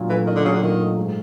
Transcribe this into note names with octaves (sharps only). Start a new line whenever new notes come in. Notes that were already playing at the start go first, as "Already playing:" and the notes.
Already playing: A#2 F#3 D4
E3 A3
D#3 D4
D3
C#3 F#3
D3
A#2 D#3
A3
G#2